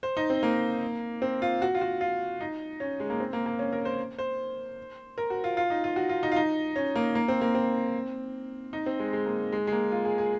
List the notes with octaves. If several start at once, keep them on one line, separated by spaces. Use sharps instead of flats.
C5
D#4
C4
A#3
C4
F4
F#4
F4
F#4
F4
D#4
C#4
G#3
A#3
C4
A#3
A#3
C#4
A#4
C5
C5
A#4
F#4
F4
F4
D#4
F4
F#4
F4
D#4
F4
D#4
C#4
A#3
A#3
C4
A#3
C4
D#4
C4
G#3
G#3
A#3
G#3
G#3
A#3
F4
G#4
G#4